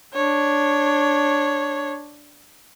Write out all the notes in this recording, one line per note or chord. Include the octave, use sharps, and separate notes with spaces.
D4 C#5